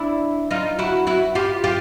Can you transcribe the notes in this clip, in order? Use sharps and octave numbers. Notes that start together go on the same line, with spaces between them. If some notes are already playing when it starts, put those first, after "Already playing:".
Already playing: D4 E4
D#4 F4
E4 F#4
E4 F#4
F4 G4
F4 G4